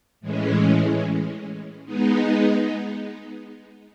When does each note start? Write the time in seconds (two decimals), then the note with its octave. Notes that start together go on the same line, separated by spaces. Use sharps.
0.21 A2 E3 G#3 C#4
1.86 G#3 B3 D#4